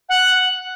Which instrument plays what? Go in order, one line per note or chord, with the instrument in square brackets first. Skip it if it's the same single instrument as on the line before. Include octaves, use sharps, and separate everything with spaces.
[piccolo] F#5